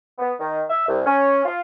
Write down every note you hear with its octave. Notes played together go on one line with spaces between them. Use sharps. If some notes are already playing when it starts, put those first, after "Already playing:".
B3
D#3
E5
C2
C#4
F4